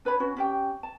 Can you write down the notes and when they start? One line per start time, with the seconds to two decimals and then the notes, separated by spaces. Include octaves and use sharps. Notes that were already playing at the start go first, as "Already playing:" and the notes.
0.05 D4 B4 C#5 B5
0.20 C#4 F#4
0.37 C#4 G4 G5
0.83 A5